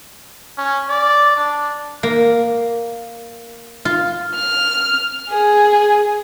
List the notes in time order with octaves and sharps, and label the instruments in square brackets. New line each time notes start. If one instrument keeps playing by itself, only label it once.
[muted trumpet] C#4
D5
D4
[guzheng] A#3
F4
[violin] F6
G#4